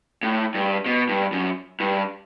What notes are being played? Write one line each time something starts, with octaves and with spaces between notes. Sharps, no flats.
A2
G2
B2
G2
F#2
G2